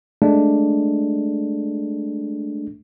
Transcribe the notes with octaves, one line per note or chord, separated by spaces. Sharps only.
G#3 A3 D4